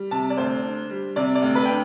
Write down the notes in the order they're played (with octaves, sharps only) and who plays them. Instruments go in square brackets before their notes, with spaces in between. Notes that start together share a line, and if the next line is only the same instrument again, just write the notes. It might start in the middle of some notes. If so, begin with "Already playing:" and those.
Already playing: [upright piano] G3
C3 A5
D5
D2 C5
D4
G3
C3 D5
D5
D2
B4
D4 G5